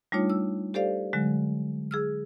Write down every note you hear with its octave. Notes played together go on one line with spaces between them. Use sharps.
G3 A3 D4 D#4 F4 C#5
E6
G4 A4 C5 D5 F5
D3 F#3 G#3
G#4 E6 F6